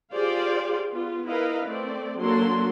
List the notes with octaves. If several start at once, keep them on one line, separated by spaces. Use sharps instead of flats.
F4 G4 G#4 C5 D5 F5
B3 F4
E4 A#4 B4 D#5 F5
A3 C4 D5
F#3 A#3 D4 F#4 A4 C6